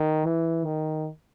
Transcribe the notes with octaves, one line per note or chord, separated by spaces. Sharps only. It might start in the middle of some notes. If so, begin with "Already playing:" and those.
Already playing: D#3
E3
D#3